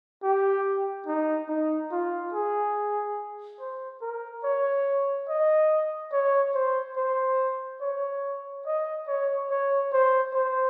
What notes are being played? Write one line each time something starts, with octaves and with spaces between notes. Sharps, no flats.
G4
D#4
D#4
F4
G#4
C5
A#4
C#5
D#5
C#5
C5
C5
C#5
D#5
C#5
C#5
C5
C5